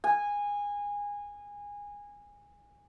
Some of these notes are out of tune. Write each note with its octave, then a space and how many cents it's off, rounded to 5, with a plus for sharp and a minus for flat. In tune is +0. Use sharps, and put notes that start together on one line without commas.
G#5 -20